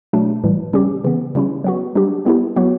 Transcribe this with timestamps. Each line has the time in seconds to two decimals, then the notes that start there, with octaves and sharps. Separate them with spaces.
0.13 B2 F#3 A3 D4
0.44 A2 E3 G3
0.73 C#3 G3 C#4 G4
1.04 C#3 E3 B3
1.35 C#3 G3 C#4 E4
1.64 F#3 B3 F#4
1.95 G3 D4 G4
2.25 G3 B3 E4 G4
2.56 F#3 B3 F#4